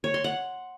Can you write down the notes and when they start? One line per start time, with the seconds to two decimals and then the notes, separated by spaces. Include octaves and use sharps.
0.04 C#5
0.14 C6
0.24 F#5